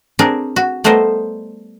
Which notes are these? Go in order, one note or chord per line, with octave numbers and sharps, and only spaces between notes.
C4 D4 G#4 A#4
F#4
G3 A3 B3 A#4 C5 D#5